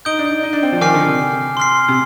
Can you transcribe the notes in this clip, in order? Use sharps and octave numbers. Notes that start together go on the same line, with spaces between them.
D#4 D#6 G6 D7 G7
D4
D#4
D#4
D4
C4
F3
D#3 G#5 D6 F6 C7
D3
C3
C6 F6 C7
C3